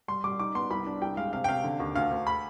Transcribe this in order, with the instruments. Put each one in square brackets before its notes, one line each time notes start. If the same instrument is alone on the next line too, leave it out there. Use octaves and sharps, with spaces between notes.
[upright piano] G3 C6
G3 D6
D#4 D6
B3 C6
C2 B5
D4
C2 G5
G#3 F5
C3 F5
G5
C3 F5
D3
D#2
D2 F5
D2
B5